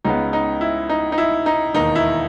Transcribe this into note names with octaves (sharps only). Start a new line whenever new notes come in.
C#2 C#3 G#3 B3 D#4
D#4
E4
D#4
D#4
E4
D#4
E1 D#2 D#3 D#4
E4